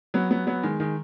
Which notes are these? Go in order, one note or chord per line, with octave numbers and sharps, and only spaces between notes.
F#3 B3
F#3 B3
F#3 B3
D#3 G#3
D#3 G#3